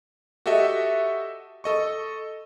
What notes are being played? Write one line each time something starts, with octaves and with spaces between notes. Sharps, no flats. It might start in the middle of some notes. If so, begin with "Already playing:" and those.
F#4 G4 A4 D#5 E5
A4 D#5 C#6